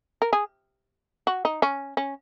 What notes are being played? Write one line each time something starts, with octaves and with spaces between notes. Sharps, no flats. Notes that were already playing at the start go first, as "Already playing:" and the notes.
A#4
G#4
F#4
D#4
C#4
C#4